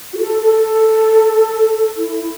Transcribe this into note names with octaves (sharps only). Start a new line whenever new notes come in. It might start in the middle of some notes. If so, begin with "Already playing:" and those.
F#4
A4
A4
E4